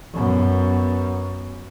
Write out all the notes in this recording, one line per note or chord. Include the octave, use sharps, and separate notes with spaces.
F#2 B3